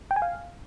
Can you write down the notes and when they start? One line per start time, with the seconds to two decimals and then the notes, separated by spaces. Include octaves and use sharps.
0.11 G5
0.16 G#5
0.22 F5